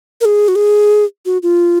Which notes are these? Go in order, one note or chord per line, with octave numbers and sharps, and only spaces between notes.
A#4
G#4
F#4
G#4
F#4
F4